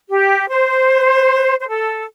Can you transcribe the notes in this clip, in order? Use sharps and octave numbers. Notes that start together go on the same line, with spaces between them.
G4
C5
C5
A4